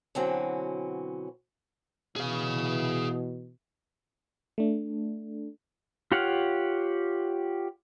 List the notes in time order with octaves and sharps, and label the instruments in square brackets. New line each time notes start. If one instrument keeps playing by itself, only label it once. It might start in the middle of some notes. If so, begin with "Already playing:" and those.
[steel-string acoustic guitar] B2 D3 E3 F#3 C4 C#4
[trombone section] B2 E3 [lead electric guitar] G#4 F5
[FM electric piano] A3 D4
[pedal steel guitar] F4 G4 C#5 F5 F#5